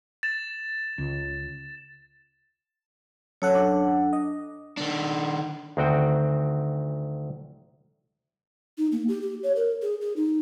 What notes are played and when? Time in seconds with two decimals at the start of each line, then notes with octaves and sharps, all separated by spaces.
0.23 A6 E7
0.98 C#2
3.42 F#2 A4 C#5 F#5
3.55 D4
4.13 D#5
4.77 D#3 D4
5.77 D2 D#3 C4 F#4 G5
8.78 D#4
8.92 A#3
9.08 G4
9.22 G4
9.43 C#5
9.56 A#4
9.82 G#4
10.01 G#4
10.16 D#4